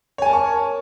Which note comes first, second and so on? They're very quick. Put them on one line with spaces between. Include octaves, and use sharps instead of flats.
C#5 G#5 A5 A#4 C#6